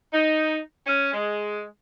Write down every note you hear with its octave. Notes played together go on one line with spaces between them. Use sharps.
D#4
C#4
G#3